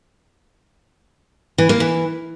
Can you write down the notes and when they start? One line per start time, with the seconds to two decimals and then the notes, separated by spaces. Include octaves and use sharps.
1.58 E3
1.69 A#3
1.80 E3